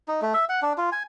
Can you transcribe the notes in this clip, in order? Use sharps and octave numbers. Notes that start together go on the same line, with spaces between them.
D#4
A3
E5
F#5
D4
F4
G#5